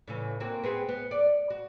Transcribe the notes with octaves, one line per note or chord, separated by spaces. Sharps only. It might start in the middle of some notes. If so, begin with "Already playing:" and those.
A2 C#3 E3
A#3 C4 F#4
B3 C4 G#4
B3
D5
F#4